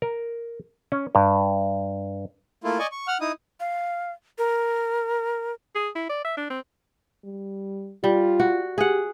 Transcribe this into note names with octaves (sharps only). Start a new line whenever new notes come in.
A#4
C#4
G2
A3 A#3 E4 F4
D5 D#5 G#5 C#6
C#6
F#5 F6
D#4 E4 D#6
F5
A#4
G#4
E4
D5
E5
D4
C4
G3
G3 F4
F#4
G4 G#4 F#5